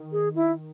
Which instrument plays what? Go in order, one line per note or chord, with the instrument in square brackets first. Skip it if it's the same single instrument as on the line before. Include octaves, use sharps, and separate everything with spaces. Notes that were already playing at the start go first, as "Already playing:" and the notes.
Already playing: [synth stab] D#3
[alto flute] G#4
E4